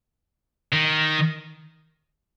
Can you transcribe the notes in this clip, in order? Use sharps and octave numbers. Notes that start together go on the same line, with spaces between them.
D#3